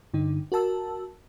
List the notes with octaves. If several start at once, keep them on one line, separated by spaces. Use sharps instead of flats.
G2 D3 D#4
F#4 A#4 A5 E6